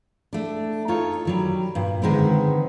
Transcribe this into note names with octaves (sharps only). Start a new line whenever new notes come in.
A3 D4
D#4 F4 A4 C#5
D#3 F#3 G3
G2 A#2
D3 D#3 G#3 B3 C4